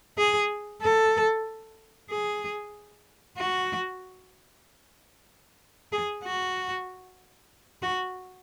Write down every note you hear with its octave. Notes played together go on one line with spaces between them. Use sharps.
G#4
A4
G#4
F#4
G#4
F#4
F#4